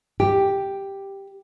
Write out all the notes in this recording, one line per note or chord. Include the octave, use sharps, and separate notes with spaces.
G4